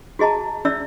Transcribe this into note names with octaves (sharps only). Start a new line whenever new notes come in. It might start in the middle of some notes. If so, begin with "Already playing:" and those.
F#4 G#4 D#5 A5 A#5
C#4 D5 E5 E6